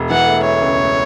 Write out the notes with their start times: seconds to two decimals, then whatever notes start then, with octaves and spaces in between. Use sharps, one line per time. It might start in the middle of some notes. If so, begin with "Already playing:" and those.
Already playing: E1
0.10 E3 F#5
0.27 A3
0.44 A3 C#5
0.62 C#2
0.79 A3